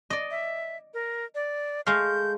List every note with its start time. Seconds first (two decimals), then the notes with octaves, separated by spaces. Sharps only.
0.10 D5 D#5
0.31 E5
0.94 A#4
1.35 D5
1.86 G#3 A3 F5 G6